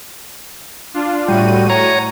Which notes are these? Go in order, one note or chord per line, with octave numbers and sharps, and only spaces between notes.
D4 F4
A2 G3 F#4 D#7
C#5 A#5